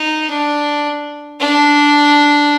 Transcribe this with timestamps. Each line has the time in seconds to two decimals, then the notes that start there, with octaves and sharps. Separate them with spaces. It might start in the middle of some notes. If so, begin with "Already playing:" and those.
Already playing: D#4
0.30 D4
1.41 D4